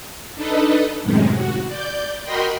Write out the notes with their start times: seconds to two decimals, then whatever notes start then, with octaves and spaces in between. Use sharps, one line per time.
0.35 D4 D#4 A4 B4 D#5
1.02 F#2 A2 C3 D#3 G#3
1.35 F#4
1.68 D5 G6
2.24 F#4 A#4 D#5 G5 B5 C6